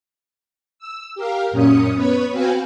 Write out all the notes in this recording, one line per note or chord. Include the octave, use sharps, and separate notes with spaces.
E6
G4 A#4 F5
F#2 A#2 C#4 D#6 C#7
B3 B4 C#5 B5
C4 F#4 B4 F5 G5 G#5